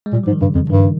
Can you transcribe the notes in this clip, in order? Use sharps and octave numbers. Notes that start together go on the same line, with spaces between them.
G#3
A#2 G3
G#2 F3
D#3
G2 C#3
F2
G2 D#3